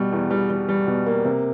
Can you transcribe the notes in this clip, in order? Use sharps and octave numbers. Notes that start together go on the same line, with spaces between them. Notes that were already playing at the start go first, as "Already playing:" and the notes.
Already playing: B2 G3
E2
G3
G3
G3
B2
A#3
C3